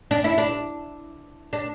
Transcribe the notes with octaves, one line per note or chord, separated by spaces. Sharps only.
D4
E4
D4
D4